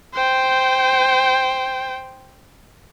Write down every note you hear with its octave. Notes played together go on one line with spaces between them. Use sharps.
C5 G5